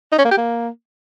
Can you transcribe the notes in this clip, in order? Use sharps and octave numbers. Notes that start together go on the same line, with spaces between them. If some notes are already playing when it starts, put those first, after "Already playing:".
D#4
C#4
A#3
G4
A#3